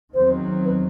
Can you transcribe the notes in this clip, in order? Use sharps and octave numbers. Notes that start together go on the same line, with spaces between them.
E2 D#3 F#3 C4 C5
B4